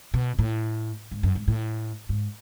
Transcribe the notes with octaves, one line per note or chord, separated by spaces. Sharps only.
B2
A2
G#2
F#2
G#2
A2
G#2